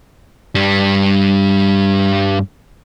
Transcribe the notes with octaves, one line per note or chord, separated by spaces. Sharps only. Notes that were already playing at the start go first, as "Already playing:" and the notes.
G2 G3